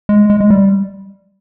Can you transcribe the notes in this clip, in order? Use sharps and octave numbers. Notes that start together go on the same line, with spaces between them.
G#3
G#3
G#3
G3